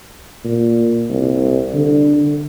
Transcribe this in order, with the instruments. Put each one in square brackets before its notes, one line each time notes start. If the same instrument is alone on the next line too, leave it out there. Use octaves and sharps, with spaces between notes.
[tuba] A#2
C2
D3